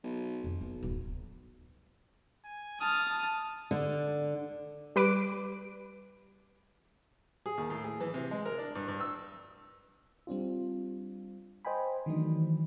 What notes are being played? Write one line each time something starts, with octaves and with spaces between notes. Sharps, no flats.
B1
F2
B1 F3 A#3
D1 F#2
G#5
A5 D#6 F6
D3
G3 B4 D6 D7
G#4
D#2
A2
G#4
E3
C3
G#3
A#4
D4
G2
G2
E6
G3 C4 D4 F4
C5 D#5 G5 G#5 B5
D#3 E3 F#3 A3 D4 D#4